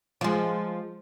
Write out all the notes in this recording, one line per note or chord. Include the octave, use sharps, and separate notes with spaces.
F3 G#3